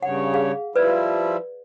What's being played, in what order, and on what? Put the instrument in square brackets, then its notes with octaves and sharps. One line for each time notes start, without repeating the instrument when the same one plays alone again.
[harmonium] G2 C#3 C#5 [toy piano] F#5
[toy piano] G#4 F5
[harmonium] F3 G3 E4 [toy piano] B4 D5